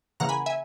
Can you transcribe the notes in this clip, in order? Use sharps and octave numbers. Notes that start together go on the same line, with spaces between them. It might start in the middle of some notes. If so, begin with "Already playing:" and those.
C#3 E3 A#3 F#5 A#5
G#5 B5
E5 G#5